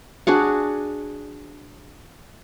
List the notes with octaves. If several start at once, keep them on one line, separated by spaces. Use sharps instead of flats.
D4 F#4 G#4 F#5